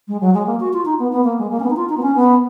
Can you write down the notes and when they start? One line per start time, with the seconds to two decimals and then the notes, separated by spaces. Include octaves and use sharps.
0.08 G#3
0.21 F#3
0.34 G#3
0.46 A#3
0.60 F#4
0.73 F4
0.85 D#4
0.99 B3
1.12 B3
1.24 A#3
1.38 G#3
1.51 A#3
1.60 C#4
1.64 B3
1.70 D#4
1.76 F4
1.89 D#4
1.97 B3
2.02 C#4
2.15 B3